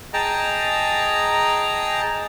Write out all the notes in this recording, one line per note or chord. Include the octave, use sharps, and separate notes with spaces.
G#4 D#5 G5 A5 A#5